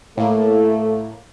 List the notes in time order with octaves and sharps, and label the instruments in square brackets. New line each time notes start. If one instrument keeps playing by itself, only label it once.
[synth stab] A2 A#3 [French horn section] A3